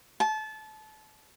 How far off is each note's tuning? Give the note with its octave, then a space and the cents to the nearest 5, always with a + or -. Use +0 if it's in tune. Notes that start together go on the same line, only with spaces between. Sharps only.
A5 -25